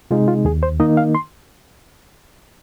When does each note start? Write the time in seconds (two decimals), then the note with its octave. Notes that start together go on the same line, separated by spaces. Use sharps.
0.11 C3 G#3 D#4 F4
0.28 F4
0.45 D#2 G#4
0.63 C5
0.80 D#3 A#3 D#4 D#5
0.97 F5
1.15 C6